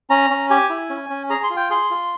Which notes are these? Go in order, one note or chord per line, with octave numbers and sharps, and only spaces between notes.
C#4 A#5
C#4
G4 G#5
E4
C#4
C#4
G#4 A#5
C6
F4
G5
G#4 C6
F4